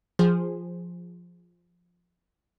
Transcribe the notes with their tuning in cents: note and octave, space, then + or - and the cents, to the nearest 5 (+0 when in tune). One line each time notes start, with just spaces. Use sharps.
F3 +0 G#4 -15 C5 +0